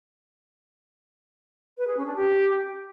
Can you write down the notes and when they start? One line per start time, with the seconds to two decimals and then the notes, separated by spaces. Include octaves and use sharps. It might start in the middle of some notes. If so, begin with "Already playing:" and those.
1.78 B4
1.87 G#4
1.97 C#4
2.06 D4
2.16 G4